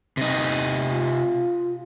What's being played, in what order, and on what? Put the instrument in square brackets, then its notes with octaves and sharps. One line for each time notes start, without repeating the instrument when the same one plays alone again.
[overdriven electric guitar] C3 D#4
[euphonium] F4